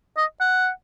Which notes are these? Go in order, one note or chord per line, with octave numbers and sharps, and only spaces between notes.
D#5
F#5